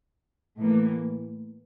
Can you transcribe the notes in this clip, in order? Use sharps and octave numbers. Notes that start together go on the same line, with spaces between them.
A2 E3 A#3